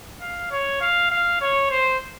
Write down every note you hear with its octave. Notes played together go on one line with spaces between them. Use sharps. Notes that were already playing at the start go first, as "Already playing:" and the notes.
F5
C#5
F5
F5
C#5
C5